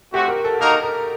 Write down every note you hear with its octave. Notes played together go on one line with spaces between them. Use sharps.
A3 C4 F#4 G4
A#4
A4
A#3 D#4 F#4 A4 A#4
A#4